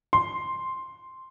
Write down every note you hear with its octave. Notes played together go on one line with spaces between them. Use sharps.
C6